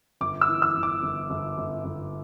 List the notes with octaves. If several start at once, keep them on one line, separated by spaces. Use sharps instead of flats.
G1 D6
E6
E3
E6
G1
D6
G1
G1
G1
G1